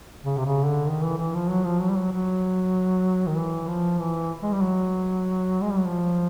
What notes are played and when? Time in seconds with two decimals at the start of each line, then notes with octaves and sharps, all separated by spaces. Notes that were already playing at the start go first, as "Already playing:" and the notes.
0.25 C#3
0.37 C3
0.45 C#3
0.66 D3
0.87 D#3
1.02 E3
1.18 E3
1.34 F3
1.49 F#3
1.65 F3
1.80 F#3
1.90 G3
1.96 F#3
2.12 F#3
3.26 D#3
3.37 E3
3.68 F3
3.99 E3
4.42 G#3
4.52 G3
4.61 F#3
5.62 G#3
5.70 G3
5.78 F#3
5.86 F3